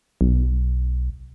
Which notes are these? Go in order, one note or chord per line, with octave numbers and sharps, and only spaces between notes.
B1